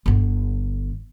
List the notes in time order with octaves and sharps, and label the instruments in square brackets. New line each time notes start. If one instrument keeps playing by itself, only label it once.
[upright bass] G1 D3